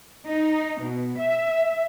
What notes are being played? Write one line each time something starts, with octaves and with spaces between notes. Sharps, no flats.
D#4
B2
E5